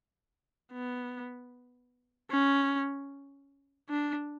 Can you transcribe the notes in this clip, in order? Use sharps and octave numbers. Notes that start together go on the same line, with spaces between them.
B3
C#4
D4